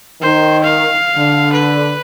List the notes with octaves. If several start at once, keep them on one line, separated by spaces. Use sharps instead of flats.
D#3 C5
F5
D3
B4